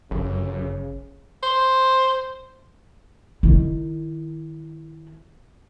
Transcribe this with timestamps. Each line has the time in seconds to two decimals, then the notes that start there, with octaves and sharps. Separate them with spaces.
0.11 G1 F#2 C#3
1.43 C5
3.43 D#3 E4